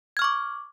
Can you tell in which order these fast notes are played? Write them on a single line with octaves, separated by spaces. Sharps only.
G#6 F6 C#6 D6